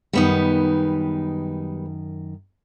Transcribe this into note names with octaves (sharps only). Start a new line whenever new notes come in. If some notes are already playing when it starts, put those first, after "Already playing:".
F#2 D#3 G3 B3 D#4